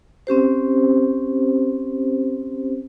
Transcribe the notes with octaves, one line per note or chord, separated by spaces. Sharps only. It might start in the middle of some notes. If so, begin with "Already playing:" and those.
C4 C#4 G4 C5